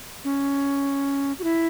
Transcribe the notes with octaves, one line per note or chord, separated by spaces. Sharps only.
C#4
F#4
E4